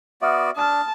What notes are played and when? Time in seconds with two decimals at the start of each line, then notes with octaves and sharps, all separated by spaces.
0.22 B3 F#4 D5 E5 D#6 F6
0.57 D4 A5 D#6 F6